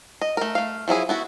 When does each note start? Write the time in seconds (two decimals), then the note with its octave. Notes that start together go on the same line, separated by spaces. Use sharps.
0.21 D#5
0.37 A3 A#4
0.55 A3 F5
0.88 F3 F#3 E4 G#4
1.09 B3 E4 F#4